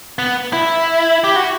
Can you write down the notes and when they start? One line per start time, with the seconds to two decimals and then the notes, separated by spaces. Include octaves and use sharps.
0.19 B3
0.53 E4
1.24 G4
1.36 F#4